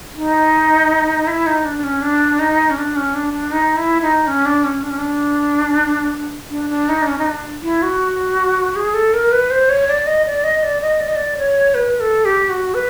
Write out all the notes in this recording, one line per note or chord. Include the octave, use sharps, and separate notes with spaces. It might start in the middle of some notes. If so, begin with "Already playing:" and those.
D#4
E4
D#4
D4
D4
C#4
D4
D#4
C#4
D4
C#4
D4
D4
D#4
E4
D#4
C#4
D4
C#4
D4
C#4
D4
D4
D4
D#4
D4
C#4
D#4
D4
E4
F#4
G#4
A4
A#4
B4
C5
C#5
D5
D#5
D5
D#5
D5
D#5
D5
D#5
D5
C#5
B4
A4
G4
F#4
B4